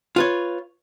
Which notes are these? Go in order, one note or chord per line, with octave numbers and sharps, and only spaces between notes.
F4 B4 C#5